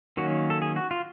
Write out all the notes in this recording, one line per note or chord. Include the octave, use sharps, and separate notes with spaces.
D#3 F#3 A#3 C#4 F#4
A4
G#4
F#4
F4